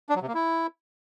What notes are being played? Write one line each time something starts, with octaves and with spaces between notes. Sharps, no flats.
D4
F#3
C3
A#3
E4